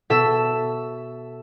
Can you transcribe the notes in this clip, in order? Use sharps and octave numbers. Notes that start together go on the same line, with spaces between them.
B2 A4 E5 E7